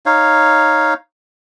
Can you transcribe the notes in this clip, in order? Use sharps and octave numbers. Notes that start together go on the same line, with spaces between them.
D#4 C#5 F5